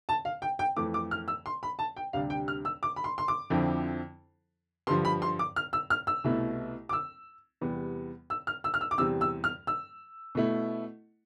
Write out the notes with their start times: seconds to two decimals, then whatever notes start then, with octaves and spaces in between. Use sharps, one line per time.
0.09 A5
0.25 F5
0.42 G5
0.59 G5
0.77 F2 E3 A3 D6
0.94 D6
1.11 F6
1.28 E6
1.46 C6
1.63 B5
1.79 A5
1.97 G5
2.13 D2 C3 G3 D4 F5
2.30 G5
2.48 F6
2.65 E6
2.83 D6
2.96 B5
3.04 C6
3.18 C6
3.28 D6
3.50 F2 D3 F3 C4 E4
4.87 G2 D3 F3 C6
5.05 B5
5.22 C6
5.39 D6
5.56 F6
5.73 E6
5.90 F6
6.07 E6
6.24 C2 B2 A3 E4
6.89 D6
6.93 E6
7.61 E2 C3 G3 B3
8.30 E6
8.47 F6
8.64 E6
8.74 F6
8.81 E6
8.91 D6
8.98 E2 C3 G3 C4 E6
9.21 E6
9.44 F6
9.67 E6
10.35 B2 A3 E4